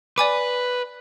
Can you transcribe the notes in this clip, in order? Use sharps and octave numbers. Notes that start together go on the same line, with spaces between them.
B4 D5 G#5 D6